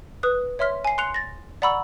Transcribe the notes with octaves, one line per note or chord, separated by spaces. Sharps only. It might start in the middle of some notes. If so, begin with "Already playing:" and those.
B4 D#6 F#6
C#5 E5 C6 F6 B6
G#5 C7
C6 F#6 C7 C#7 F7
A6 A#6
D5 F#5 A#5 B5 C#6 E6